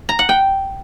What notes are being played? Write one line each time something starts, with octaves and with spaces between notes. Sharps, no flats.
A#5
F#5
G5